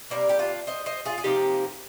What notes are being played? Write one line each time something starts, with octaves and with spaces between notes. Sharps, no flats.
C3 G3 A#3 A#4 D5
G4
D4 F4
C5 D#5
C5 D#5
F4 G#4
G#4
C3 F3 A#3 D#4 G4